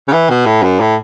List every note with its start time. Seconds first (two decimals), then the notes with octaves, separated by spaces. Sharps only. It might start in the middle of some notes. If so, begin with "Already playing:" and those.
0.08 C#3
0.13 E3
0.30 B2
0.46 A2
0.63 F#2
0.80 A2